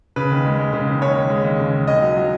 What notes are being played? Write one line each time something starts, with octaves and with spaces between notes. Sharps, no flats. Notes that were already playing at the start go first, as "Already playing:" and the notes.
C#3 B4
D#2
G#3
G#3
C#3
D#2
D#2 C#5
D#2
G#3
D#2
C#3
D#2
D#2 D#5
F#3
F#3